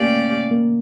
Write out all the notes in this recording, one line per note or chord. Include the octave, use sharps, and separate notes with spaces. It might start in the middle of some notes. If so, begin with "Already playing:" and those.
Already playing: A3 A#3 C#4 G4 D5 F5
A#3